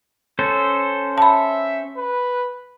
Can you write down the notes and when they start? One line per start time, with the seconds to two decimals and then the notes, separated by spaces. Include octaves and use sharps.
0.39 C#4 A4 C5
1.18 E5 A5 B5
1.97 B4